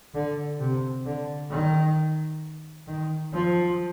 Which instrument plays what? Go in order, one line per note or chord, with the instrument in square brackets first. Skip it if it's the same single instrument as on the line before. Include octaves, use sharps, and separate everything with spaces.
[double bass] D3
C3
D3
D#3
D#3
F3